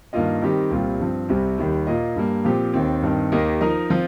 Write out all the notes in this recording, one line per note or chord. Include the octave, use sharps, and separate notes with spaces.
G2 D#3 A#3 F4 D#5
D#3 G3 C4 G4 D#5
C2 A#2 G3 C4 F4
G2 F3 C4
C2 C3 G3 C4
D#2 D#3 G3
A#2 A#3 F4 D#5
G2 G3 A#3
A#2 F3 C4 G4
D#2 D#3 C4
G2 D#3 C4
D#2 D#3 A#3 G4 D#5
F3 D#4 A#4 D#5
F3 C4 F4